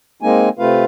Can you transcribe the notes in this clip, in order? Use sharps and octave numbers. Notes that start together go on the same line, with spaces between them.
G#3 A#3 C4 D#4 G#5
C3 A3 C4 F4 B4 F5